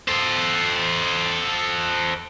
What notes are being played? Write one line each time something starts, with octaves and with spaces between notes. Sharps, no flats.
A4 C5